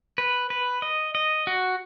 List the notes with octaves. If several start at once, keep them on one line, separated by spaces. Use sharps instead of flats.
B4
B4
D#5
D#5
F#4